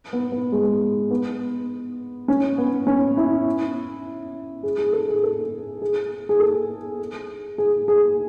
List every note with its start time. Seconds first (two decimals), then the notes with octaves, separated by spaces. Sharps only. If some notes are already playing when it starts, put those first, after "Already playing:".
0.13 B3
0.32 B3
0.52 G#3
1.11 B3
2.28 C#4
2.58 B3
2.87 C#4
3.17 E4
4.63 G#4
4.78 G#4
4.93 A4
5.08 G#4
5.23 A4
5.82 G#4
6.29 G#4
6.40 A4
7.58 G#4
7.88 G#4